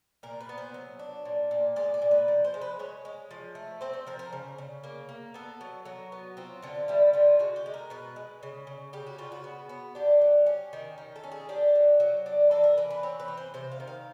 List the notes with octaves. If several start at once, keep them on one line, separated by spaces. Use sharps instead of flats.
A#2 A#4
B4
B3
C5
F#3
D4
A#2
A#2
G#3 D5
D5
A#2
B4
F3
C5
G#3
B4
G#3 C#5
G#3
F3
A3
C4 C5
C5
F3 A#4
A#4
C#3
C#3
A#3
A#3
B3 A4
F#3
F#3 F#4
B3
C4 F4
D3 F4
G3 E4
D3 F4
G#3 F#4
G4
G#3
A#4
B2 B4
G#3
C#3
C#3
C#3 G4
F#4
C#3 F4
F#4
B3
B3
D4 G4
F#3
C#4
D#3
D#3
A4
C#4
G#4
D4 G4
F#3
F#3
D4
E3 A4
A#4
E3 B4
B4
C4 C#5
B4
E3
C5
C3 C5
F5
D#3
F5